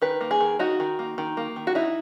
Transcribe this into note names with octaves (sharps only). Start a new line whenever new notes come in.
D#3 B4
A#3
G#4
D#3
D#4 F#4
D#3
A#3
D#3
A#3
D#3
F#4
D#4 E4